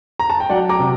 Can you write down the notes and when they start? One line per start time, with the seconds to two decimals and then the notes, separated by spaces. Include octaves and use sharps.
0.19 A#5
0.30 A5
0.40 G5
0.50 F#3 D5 F#5
0.69 A#5 D6
0.80 C3